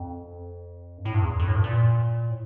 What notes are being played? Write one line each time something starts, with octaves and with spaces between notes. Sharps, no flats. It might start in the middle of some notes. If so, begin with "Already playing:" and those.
Already playing: F2
G2
A2
G2
E2
F2
A2
G2
A#2
A2